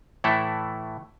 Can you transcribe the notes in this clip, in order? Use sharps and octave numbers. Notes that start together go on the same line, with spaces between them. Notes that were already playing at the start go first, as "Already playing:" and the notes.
A2 E3 A3 E4 A4